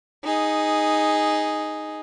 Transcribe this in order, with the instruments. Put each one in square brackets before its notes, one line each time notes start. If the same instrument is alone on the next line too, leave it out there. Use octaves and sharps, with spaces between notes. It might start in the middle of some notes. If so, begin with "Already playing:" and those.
[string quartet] D#4 G#4